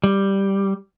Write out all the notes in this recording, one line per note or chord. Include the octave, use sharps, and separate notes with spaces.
G3